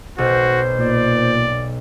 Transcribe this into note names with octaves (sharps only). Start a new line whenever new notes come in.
B1 F#4 C5
A#2 D5